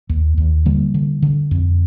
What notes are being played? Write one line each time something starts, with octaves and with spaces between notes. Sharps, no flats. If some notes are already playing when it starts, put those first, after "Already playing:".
D#2
D#2
D3 G3 A#3
D3
D3
F2